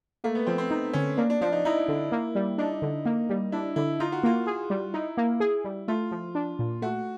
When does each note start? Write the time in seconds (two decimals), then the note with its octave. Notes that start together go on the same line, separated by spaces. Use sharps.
0.24 A3 A#3
0.35 B3
0.47 F3 C4
0.58 C4
0.70 D#4
0.93 D3 C#4
1.17 A#3 D4
1.30 D4
1.41 F3 D4
1.52 D#4
1.65 D#4 E4
1.88 D3
2.12 A#3
2.35 G3
2.58 D4 D#4
2.82 D3
3.06 A#3
3.30 G3
3.52 D4 E4
3.76 D3 E4
4.00 D#4 F4
4.12 F#4
4.23 A#3 F4
4.47 G#4
4.70 G3
4.94 D#4 E4
5.17 A#3
5.40 G#4
5.65 G3
5.88 A3 F4
6.11 F3
6.35 D4
6.59 A#2
6.82 A3 F#4